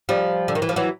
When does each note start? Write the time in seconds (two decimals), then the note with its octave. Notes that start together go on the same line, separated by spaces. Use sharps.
0.09 F3 G3
0.48 D3
0.55 D#3
0.62 E3
0.69 F3
0.76 E3 F#3